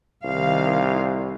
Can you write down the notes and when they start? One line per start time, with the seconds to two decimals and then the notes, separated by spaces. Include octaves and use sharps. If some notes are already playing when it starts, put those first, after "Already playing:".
0.25 C2 D#3 F5